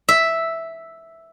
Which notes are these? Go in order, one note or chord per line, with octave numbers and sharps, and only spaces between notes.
E5